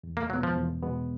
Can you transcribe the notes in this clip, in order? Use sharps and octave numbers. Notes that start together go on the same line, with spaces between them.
E2
A#3
B2 F#3 G#3 B3
F3
E2
B2 G#3 B3